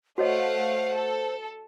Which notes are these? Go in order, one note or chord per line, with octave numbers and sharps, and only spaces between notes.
A3 F#4 C5 C#5 D#5 F5 F#5
A4